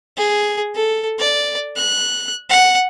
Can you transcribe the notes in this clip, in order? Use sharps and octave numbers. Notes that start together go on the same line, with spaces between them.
G#4
A4
D5
F#6
F#5